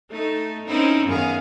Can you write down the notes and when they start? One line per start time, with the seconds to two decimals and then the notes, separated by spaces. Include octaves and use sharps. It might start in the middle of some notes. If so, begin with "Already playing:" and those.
0.10 A3 D#4
0.67 C4 C#4 D#4 E4 A#4
1.07 F#2 D#3 B3 G#4 F5